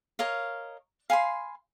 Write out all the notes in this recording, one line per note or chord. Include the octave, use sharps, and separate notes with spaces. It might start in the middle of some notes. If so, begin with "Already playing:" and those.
A#4 C#5 D#5 F5
F5 G#5 B5 C6